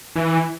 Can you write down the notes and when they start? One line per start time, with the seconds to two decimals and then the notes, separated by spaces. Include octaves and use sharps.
0.16 E3